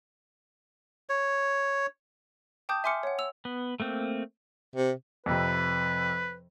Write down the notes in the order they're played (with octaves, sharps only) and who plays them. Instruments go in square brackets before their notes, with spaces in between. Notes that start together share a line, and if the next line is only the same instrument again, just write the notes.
[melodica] C#5
[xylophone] G5 A5 D6 D#6 G6
E5 G#5 C6 D6 F6 C#7
C#5 F#5
E6 F7
[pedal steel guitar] B3
A3 A#3 C4
[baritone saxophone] C3
[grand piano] F2 C3 [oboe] B4